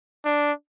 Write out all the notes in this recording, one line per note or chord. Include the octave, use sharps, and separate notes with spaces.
D4